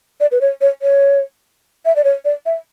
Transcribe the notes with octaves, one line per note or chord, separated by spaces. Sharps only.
D5
B4
C#5
C#5
C#5
E5
D5
C#5
D5
E5